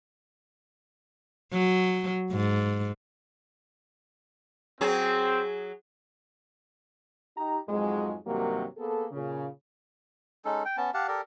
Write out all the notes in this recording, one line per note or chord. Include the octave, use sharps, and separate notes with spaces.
F#3
G#2
F#3 C4 G#4
D#4 G4 A#5
F2 G#2 F3 F#3 G#3
G2 C3 D#3 F#3 G3 A#3
A#3 B3 G#4 A4
A#2 C#3
G#3 C#4 D#4 A4
G5
B3 C#4 A5
G4 F5 F#5 A5
G4 A4 A#4 D5